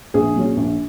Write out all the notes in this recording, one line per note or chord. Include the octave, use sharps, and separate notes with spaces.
A#1 G#4
A#2 F#3 C#4
A#1